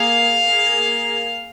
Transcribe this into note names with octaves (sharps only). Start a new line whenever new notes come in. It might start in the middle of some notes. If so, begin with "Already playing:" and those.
Already playing: A#3 G#4 F5
A#3 G#4